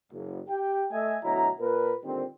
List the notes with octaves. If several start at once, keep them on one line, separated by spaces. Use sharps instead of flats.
F#1
G4 G5
A3 D#5 E5 G#5
D2 B2 F#3 E4 D#5 A#5
A#2 A#4 B4
A#2 D3 D#3 G3 C4